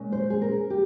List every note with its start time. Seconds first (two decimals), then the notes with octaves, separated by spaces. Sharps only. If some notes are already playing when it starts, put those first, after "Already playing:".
Already playing: A#2 G#3 C#4
0.12 C5
0.30 G#4
0.41 A#4
0.70 G4